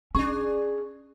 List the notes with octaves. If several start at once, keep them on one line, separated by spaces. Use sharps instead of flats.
C#4 D4 G#4 C#6